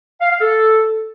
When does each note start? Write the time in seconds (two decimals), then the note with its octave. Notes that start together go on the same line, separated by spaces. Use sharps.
0.21 F5
0.31 F5
0.41 A4